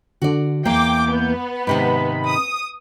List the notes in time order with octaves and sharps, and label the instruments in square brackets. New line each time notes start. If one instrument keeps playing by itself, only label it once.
[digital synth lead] D3 [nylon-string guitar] F#4 D5
[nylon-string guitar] E2 A#3 [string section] G5 D6 [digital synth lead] G6
[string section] B3
[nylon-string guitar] G#2 C3 D#3 [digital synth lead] B5
[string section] D#6